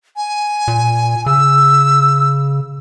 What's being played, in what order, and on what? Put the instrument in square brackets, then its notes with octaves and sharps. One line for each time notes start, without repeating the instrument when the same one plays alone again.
[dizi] G#5
[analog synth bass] A#2
[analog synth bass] C#3 [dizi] E6